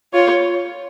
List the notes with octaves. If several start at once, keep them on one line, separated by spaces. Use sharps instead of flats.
F4 C#5